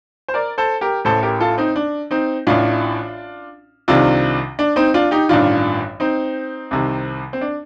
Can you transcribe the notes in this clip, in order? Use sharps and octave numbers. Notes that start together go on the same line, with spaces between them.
C5
A#4 D5
A4 C5
G4 A#4
A1 A2 A4 C5
G4 A#4
F4 A4
C4 D#4
D4
C4 D#4
A1 A2 D4 F4
C2 C3 D#3 D4 F4
D4
C4 D#4
D4 F4
D#4 G4
A1 G2 D#3 D4 F4
C4 D#4
C2 C3 D#3
C4
D4